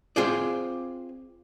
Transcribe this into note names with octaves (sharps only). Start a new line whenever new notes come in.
C4 F4 G#4 C5 D5